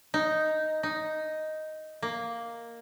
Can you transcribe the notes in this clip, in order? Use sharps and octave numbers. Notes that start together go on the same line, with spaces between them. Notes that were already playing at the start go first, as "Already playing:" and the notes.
D#4
D#4
A#3